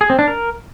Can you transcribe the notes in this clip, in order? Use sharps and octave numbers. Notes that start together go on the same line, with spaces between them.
G#4
C4
D4
A#4